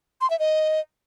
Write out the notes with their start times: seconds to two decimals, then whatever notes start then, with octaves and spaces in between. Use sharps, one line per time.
0.21 C6
0.30 E5
0.39 D#5